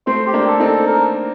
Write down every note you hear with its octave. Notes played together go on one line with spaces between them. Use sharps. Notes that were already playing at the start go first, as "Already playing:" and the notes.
A3 C4 C5
G4
A#3 D4
A4
C4 D#4
A4
A#4